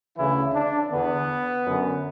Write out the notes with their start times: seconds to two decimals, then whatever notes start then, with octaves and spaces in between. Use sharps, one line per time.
0.17 D2 C#3 E3 E4
0.54 D4
0.91 E2 D3 B3
1.66 F#2 D3